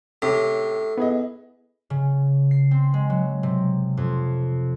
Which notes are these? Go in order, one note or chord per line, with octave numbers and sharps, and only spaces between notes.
A2 C3 C#4 A4
B3 E4 G#4 D#5
C#3
C7
C4
G#3
F#3
C3
F2